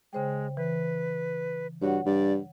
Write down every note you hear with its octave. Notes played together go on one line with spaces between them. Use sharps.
C#3 G#3 C5 G5
E3 B4
G2 F#4 C#5 F#5
G2 D5